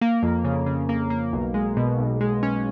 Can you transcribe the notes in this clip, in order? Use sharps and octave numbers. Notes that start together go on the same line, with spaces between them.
A#3
F2
C#3
C#3
A#3
A#3
B1
G#3
B2
B1
G#3
C#4